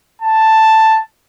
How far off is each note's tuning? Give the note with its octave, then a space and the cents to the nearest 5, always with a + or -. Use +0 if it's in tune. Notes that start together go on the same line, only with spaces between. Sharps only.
A5 +5